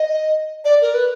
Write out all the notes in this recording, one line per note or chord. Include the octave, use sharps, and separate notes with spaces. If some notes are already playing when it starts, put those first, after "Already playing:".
Already playing: D#5
D5
A#4
B4